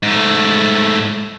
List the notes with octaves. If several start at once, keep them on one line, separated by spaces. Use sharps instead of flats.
G#2 A3